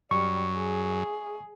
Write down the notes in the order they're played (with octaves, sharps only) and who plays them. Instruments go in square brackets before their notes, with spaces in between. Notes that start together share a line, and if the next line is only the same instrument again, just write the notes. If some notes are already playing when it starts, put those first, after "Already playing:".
[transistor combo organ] F#2 [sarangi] G3 [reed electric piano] C#6
[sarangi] G#4